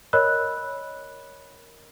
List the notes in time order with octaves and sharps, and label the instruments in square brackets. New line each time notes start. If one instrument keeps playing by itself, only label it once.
[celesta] A#4 C#5 D#5 B5 E6 F#6